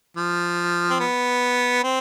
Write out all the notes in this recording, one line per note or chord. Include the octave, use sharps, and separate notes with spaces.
F3
C4
B3
C4